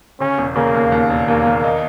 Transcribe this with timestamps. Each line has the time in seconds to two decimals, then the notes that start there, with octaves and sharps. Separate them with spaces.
0.20 C#3 C#4
0.38 E1
0.56 C#3 A#3
0.74 D#2
0.92 D#2
1.10 E1
1.28 D#2 A#3
1.47 D#2
1.64 D#4